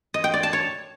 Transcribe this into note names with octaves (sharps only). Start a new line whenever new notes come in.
D#5
G5
D5
A5
C#5